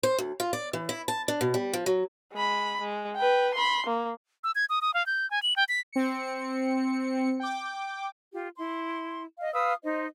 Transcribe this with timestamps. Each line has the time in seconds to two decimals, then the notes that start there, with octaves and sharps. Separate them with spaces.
0.03 C5
0.19 D2
0.40 F4
0.53 D5
0.73 E3
0.89 E4
1.08 A5
1.28 D4
1.41 B2
1.54 G3
1.73 F3
1.86 F#3
2.33 G#3 B5
2.81 G#3
3.16 B4 G5
3.54 B5 C6
3.86 A#3
4.44 E6
4.55 G#6
4.69 D#6
4.81 D#6
4.94 F5
5.06 G6
5.31 G#5
5.42 F#7
5.56 G5
5.69 B6
5.93 C4 C#7
7.40 G5 D6
8.34 F4 G4
8.56 E4 C6
9.39 D#5 F5
9.54 B4 F5 D#6 E6
9.84 D#4 C5 D#5